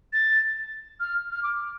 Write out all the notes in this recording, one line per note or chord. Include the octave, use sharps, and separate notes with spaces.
A6
F6
F6
D6